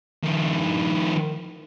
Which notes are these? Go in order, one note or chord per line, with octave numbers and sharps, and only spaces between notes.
D#3 F3